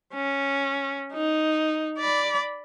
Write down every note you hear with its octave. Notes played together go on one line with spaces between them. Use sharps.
C#4
D#4
D5 B5